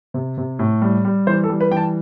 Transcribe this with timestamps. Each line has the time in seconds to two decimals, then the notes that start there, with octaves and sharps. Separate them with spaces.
0.14 C3
0.38 C3
0.59 A2
0.82 G3
1.05 G3
1.27 E3 C5
1.43 A4
1.49 G3
1.60 B4
1.71 E3 G5
1.77 A5